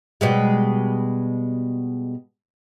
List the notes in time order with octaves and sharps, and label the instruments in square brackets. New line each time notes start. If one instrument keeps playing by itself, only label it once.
[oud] B2 G3 G#3